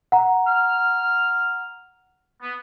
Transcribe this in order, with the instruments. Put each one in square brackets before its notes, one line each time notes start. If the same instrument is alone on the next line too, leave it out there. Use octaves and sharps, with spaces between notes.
[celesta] F#5 A#5
[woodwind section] F6
B3